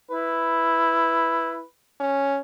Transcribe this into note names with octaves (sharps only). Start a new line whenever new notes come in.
E4 B4
C#4